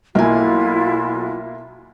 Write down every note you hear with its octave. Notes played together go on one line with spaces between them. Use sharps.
B1 A#3 E4 F4 E5 G#5